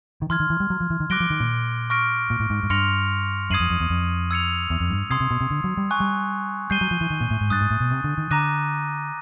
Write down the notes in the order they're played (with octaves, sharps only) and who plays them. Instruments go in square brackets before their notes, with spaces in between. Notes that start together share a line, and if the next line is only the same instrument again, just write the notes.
[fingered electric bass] D#3
[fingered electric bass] E3 [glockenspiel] C6 F6 G#6
[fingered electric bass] D#3
E3
G3
F#3
F3
E3
D#3
[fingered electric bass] F#3 [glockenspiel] D6 F#6 A#6 D7 G7
[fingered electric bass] F3
D#3
A#2
[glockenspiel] C#6 F6 A#6 D7
[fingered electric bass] A#2
A2
G#2
G#2
[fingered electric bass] G2 [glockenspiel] C6 F6 A#6 C#7 F7
[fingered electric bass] F#2 [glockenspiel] D#6 G#6 C7 D#7 F#7
[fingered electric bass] F2
F2
E2
F2
[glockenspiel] E6 G#6 C#7 F7
[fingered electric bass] E2
F2
G2
[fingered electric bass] C3 [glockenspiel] C6 D#6 G#6 C7
[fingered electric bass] C3
B2
C3
D3
F#3
G3
[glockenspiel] G#5 C#6 F#6
[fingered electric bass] G3
[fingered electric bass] G3 [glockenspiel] G6 C7 D#7 G7
[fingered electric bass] F#3
F3
E3
D#3
A#2
A2
G#2
[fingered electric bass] G2 [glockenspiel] D#6 F#6 A6
[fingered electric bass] G#2
A2
B2
C3
D3
D#3
[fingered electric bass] D3 [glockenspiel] A#5 D6 F#6 A#6 D#7